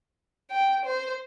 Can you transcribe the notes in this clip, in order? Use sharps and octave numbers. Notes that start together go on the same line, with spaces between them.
G5
C5